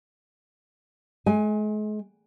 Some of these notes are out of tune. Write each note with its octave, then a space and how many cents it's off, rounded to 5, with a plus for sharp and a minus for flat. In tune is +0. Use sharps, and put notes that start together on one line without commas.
G#3 +40 G#5 +0